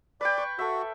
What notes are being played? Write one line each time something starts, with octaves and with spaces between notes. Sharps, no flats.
B4 D5 G5
C#6
F#4 A4 E5